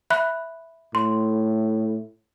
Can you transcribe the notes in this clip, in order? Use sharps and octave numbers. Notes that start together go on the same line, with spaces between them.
E5 B5 F#6
A2 C6